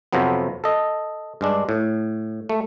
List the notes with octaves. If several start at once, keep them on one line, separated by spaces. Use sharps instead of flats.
F2 C3 F3 F#3 B3
A4 D#5
G2 G#3 D4
A2
A3